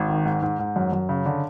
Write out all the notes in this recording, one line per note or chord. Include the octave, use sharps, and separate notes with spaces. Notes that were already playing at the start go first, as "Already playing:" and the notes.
Already playing: G#1
D#3
G#2
G#2
G#2
F#2
F#2
C#3
D3